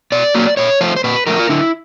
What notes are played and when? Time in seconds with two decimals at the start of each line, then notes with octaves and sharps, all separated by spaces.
0.12 B2 D5
0.35 F#3 A#3
0.57 A#2 C#5
0.81 F3 A3 C5
0.96 C5
1.04 A#2 B4
1.27 F3 A3 A#4
1.39 F4
1.49 D3 E4